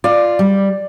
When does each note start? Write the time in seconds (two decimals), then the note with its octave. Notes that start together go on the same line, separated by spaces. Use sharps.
0.04 F4 D5
0.39 G3